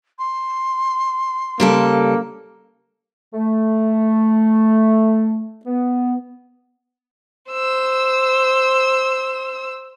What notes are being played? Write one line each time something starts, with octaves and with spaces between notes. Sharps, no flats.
C6
C#3 G3 A#3 A4
A3
B3
C5 E6